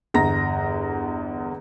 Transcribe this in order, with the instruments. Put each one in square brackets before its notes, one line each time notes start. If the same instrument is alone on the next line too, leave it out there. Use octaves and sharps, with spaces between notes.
[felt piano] G1 E2 A#5 A#6